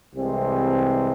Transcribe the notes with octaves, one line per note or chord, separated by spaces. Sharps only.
C2 C3 E3 G#3 C4